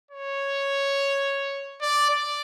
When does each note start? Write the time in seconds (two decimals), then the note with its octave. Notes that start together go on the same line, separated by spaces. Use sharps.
0.11 C#5
1.82 D5
2.10 D5